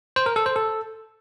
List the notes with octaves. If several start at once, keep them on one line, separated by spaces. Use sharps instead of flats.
C5
A#4
A4
C5
A4